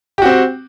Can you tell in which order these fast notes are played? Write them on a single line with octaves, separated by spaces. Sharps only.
G4 F#4 C4